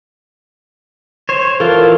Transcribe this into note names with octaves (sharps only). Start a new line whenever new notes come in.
C5 C#5
E3 F4 A4 A#4